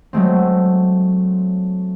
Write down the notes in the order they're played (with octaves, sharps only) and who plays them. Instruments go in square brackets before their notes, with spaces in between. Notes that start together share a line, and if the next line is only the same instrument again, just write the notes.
[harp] F#3 G#3 A3 C4